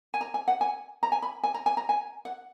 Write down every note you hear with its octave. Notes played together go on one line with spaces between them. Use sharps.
G#5
A#5
G#5
F#5
G#5
A#5
G#5
B5
G#5
A#5
G#5
A#5
G#5
F#5